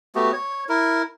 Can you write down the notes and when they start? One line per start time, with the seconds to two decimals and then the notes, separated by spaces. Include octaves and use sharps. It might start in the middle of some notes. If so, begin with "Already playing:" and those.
0.15 A3 B3 F#4 G4
0.33 C#5
0.69 E4 A#4